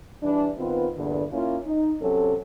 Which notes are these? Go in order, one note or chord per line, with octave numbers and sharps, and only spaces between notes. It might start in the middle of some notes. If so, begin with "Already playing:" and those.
E3 G3 D4
D#3 B3 C4 F4 B4
E2 G2 A#2 D3
A#3 C#4 E4 F4
D#4
C3 F#3 C#4 A4